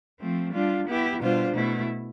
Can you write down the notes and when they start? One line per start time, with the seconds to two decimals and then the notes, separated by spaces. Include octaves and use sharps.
0.18 F3 A3 C4
0.52 G3 D4 F4
0.86 B3 E4 G4
1.20 B2 G3 D4 F4 C5
1.53 B2 A3 E4